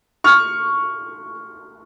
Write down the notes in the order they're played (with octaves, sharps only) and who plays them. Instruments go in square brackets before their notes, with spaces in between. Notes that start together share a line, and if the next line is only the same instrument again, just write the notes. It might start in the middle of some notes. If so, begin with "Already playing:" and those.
[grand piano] C#6 F6